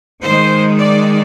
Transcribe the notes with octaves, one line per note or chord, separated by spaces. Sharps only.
D#3 G#3 C5
D5